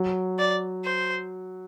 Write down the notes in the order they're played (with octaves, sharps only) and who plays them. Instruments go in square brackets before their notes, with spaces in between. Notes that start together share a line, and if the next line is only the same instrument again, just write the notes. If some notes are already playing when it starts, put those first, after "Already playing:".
Already playing: [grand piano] F#3
[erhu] D5
C5